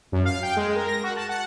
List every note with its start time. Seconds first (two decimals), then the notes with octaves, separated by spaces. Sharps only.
0.12 F#2
0.25 F5
0.43 G5
0.56 G#3
0.76 A#4
0.88 A#6
1.03 F#4
1.16 A5
1.29 F#5